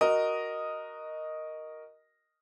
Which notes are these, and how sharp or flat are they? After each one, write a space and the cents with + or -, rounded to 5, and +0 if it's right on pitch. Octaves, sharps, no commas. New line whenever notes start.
F#4 +0 A#4 +0 D#5 +0